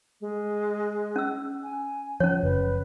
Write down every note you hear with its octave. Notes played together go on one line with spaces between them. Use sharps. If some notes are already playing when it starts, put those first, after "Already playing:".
G#3
C#4 E6
G#5
F3 C#4 C#5
F#1 B4